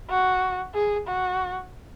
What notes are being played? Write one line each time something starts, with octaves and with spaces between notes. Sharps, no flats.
F#4
G#4
F#4